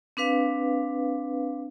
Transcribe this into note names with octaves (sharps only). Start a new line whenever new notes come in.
C4 D4 B4 F5